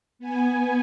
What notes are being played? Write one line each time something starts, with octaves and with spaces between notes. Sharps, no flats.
B3 G#5